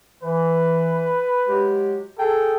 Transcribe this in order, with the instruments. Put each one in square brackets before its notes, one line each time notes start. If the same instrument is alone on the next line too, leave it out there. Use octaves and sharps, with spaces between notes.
[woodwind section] E3 [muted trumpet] B4
[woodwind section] F#3 G#3 G4
[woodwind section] G#4 G5 [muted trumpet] A4